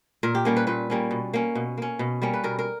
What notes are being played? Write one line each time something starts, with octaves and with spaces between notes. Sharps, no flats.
A#2 A#4
G4
G3 A#3 C#4
B4
A#2 B4
G3 A#3 C#4
B2
A#3 C#4
B2
A#3 C#4
B2
G3 A#3 C#4
B4
B2 A#4
A#4